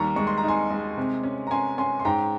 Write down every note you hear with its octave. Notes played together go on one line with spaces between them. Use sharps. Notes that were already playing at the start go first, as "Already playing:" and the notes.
Already playing: D#2 G3 A#5 C#6
G#3 C#6
C6
A#5
D#4 G#5 C6
G#3
C3
C#4
A#5
C#4 G#5 C6
C#4 G#5 C6
C6
G#2 G5 A#5